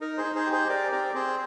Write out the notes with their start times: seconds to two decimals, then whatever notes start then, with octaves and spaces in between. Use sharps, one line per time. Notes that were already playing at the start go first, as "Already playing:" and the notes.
0.01 D#4 A#4
0.17 G#4 C5
0.24 D#4
0.35 G#4 C5
0.46 G4
0.52 G#4 C5
0.69 G4 A#4 D5
0.91 C4 A#4 D5
1.15 C4 G#4 C5